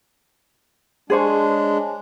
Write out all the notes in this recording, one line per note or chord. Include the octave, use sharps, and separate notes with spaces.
G#3 D4 G#4 C5 C#5